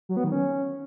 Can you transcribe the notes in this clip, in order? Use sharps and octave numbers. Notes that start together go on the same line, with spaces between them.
F#3
B3
D#3
C#4